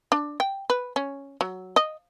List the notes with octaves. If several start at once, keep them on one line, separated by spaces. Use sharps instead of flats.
D4
G5
B4
C#4
F#3
D#5